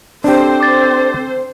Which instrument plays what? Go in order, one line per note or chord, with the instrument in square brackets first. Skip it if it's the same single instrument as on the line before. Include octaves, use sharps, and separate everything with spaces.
[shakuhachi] C4 [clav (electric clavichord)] D4 G4 [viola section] A4 C5
[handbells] D6 A6